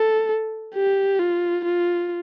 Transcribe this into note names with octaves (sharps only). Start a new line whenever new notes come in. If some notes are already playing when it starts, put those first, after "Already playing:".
Already playing: A4
G4
F4
F4